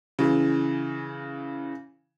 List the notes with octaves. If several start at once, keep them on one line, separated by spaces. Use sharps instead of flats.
C#3 E3